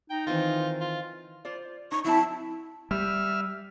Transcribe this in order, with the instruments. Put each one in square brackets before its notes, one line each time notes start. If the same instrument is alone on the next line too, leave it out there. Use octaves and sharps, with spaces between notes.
[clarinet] D#4 [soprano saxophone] G5
[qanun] D#3 E3 C4 [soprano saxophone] F4
[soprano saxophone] F4
[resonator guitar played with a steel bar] F4 C5 D5
[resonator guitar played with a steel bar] D#4 [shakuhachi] C#6
[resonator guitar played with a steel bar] F#3 C4 A5 [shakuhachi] E4
[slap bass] G3 [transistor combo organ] E5 F6